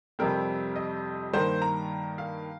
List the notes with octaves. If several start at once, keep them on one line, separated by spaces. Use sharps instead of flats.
F2 C3 G3 C4 A#4
D#5
G2 D#3 A#3 C5
A#5
F5